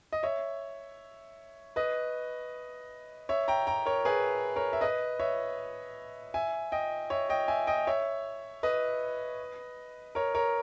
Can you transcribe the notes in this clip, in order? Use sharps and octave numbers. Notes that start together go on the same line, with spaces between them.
D#5
C#5 E5
B4 D#5
C#5 E5
G5 A#5
G5 A#5
A#4 C#5
G#4 B4
A#4 C#5
E5
B4 D#5
C#5 E5
E5 G#5
D#5 G5
C#5 E5
D#5 G5
E5 G#5
D#5 G5
C#5 E5
B4 D#5
A#4 C#5
A#4 C#5